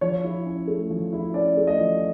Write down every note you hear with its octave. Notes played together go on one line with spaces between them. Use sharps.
F3 C#5
E4
C#4
A3
F3
E4
C#4 D5
A3
D#5
F3